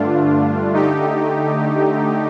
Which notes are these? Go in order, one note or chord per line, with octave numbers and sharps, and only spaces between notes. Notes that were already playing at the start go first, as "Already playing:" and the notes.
Already playing: G2 D3 A3 D4 F4
D3 A3 D#4 G4